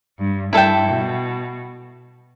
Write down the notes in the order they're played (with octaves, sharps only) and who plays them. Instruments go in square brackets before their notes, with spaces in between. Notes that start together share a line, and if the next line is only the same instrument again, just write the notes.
[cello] G2
[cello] G2 [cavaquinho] E4 A4 E5 G5
[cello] B2